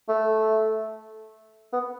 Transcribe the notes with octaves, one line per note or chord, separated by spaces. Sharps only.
A3
B3